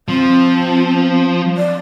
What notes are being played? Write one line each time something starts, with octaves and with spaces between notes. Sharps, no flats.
F3 C4
D5